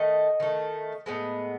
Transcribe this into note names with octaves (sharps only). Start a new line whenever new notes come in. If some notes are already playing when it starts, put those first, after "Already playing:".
Already playing: D#3 A3 D#5
D#3 A3
A2 G#3 B3